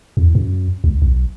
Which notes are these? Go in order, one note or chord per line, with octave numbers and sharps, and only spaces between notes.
E2
F#2
C#2
B1